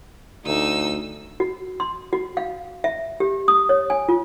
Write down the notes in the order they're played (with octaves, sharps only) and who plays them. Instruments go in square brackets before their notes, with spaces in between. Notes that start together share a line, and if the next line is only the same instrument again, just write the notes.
[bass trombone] D2 [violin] D#4 E6
[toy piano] F#4
C6
F#4
F5
E5
G4
D#6
C#5
G#5
F4